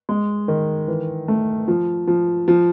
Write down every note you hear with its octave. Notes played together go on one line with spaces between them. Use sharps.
G#3
D#3
E3
A3
F3
F3
F3